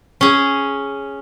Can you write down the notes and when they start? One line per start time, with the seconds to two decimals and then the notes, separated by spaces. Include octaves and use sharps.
0.21 C#4 G#4